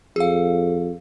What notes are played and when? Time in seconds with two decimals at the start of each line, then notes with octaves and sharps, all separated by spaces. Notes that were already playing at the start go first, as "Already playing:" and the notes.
0.16 F2 G#4 F5